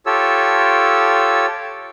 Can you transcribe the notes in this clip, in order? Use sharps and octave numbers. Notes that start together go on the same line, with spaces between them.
F4 G4 A4 C#5 E6